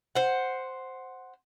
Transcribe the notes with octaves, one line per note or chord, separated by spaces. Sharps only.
C5 F#5